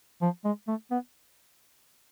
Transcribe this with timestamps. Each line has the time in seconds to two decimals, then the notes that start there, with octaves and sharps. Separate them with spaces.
0.22 F3
0.44 G#3
0.68 A3
0.91 B3